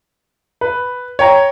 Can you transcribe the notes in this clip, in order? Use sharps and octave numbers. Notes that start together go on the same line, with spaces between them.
B4
C#5 G5 A#5